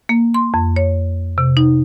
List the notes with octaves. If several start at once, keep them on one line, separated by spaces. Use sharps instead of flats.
A#3
C6
F2
C#5
C3
D#4